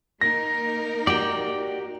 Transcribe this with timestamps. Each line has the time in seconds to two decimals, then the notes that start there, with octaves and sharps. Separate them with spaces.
0.21 A#3 D#4 A#4 A#6
1.07 F#4 G4 D5 G5